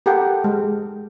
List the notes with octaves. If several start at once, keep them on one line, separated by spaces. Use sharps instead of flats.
G4 A4 A#4 F#5 G5
G#3